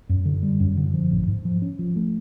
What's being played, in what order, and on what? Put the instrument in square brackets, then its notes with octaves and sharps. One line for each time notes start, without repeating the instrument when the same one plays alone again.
[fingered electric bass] F#2
D3
G3
F#2
D3
F3
A1
G#2
F3
C#4
F3
A3